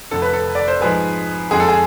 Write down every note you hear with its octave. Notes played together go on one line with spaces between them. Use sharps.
F1 F2 D3 A4
B4
A4
D5
C5
G#2 F3 G#3 G#4 B4
F2 D3 G#3 G#4
A4
G#4